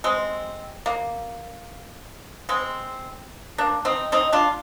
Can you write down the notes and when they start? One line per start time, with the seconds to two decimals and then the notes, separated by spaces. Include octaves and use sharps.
0.04 G#3 C4
0.86 A#3
2.49 G#3 C4
3.58 A#3 D4
3.85 C4 D#4
4.12 C4 D#4
4.33 D4 F4